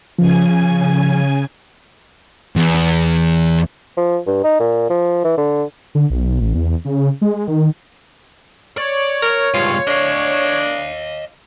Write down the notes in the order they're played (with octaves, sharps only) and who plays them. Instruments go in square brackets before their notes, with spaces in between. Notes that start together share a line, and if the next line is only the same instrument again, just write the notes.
[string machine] C#3 G#5 [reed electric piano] F3
[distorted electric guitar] E2
[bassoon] F3
G2
D#4
A#2
F3
E3
D3
[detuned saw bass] D3
B1
A1
E2
C#3
G#3
D#3
[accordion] C#5 [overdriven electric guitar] D5
[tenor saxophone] A#4
[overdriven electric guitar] C#2 G2 [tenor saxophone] F4
[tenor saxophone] D4 [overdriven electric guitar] D#5 F5